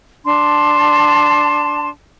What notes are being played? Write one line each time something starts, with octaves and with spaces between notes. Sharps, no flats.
D4 A5 C6